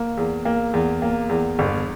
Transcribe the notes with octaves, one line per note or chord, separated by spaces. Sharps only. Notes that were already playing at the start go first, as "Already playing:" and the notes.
Already playing: A#3
E2
A#3
E2
A#3
E2
G1